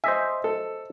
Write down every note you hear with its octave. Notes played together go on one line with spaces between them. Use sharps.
C5 D#5 E5 G#5
A4